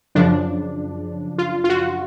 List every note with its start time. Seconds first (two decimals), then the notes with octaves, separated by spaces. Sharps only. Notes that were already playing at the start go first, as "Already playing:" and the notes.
0.15 F#2 C#3 F3 D4
1.38 F4
1.64 F4
1.69 F#4